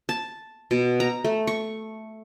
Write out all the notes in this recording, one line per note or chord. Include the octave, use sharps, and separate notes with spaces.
A5
B2
A#5
A3
C#6